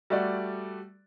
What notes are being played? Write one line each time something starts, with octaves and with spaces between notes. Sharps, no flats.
G3 A3 F#4 D5